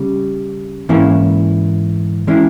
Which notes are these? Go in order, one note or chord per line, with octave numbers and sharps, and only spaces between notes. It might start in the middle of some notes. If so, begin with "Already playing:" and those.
Already playing: C#3 G3
G#2 E3 A#3 C#4 E4
E3 G#3 C#4 E4